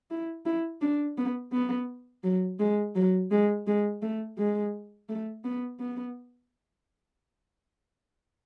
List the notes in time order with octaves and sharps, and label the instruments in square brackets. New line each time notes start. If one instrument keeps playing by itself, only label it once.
[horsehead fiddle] E4
E4
D4
B3
B3
F#3
G#3
F#3
G#3
G#3
A3
G#3
A3
B3
B3